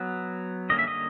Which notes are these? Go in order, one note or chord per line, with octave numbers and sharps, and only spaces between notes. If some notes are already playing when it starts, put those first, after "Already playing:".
Already playing: F#3 B3
D3 G3 A#3 C#4 D#5
E5
D#5